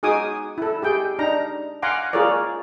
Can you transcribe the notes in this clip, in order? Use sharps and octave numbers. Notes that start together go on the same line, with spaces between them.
D#4 F#4 G#4 G#5 D6 D#6
E4 A4
G4 G#4 G5
D4 D#4 A#5
F5 F#5 G#5 A#5 C6 D6
F4 G#4 A#4 C#5 D5